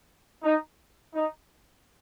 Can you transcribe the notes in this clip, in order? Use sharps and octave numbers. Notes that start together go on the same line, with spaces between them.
D#4
D#4